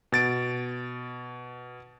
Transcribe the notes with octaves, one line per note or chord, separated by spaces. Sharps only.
B2 A6 D7